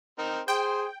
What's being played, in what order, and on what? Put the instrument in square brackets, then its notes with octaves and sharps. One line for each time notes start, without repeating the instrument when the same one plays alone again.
[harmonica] C4 D#4 A#4
[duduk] G#4 [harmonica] C5 C6 [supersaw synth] G5